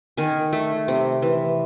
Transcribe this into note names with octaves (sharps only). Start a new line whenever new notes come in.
D#3 G#5
A3
C3
E3